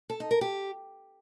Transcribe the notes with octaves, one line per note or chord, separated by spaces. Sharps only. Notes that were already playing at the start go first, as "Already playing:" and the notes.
A4
D#4
A#4
G4